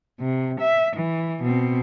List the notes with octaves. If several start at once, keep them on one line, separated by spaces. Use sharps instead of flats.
C3
E5
E3
B2 C4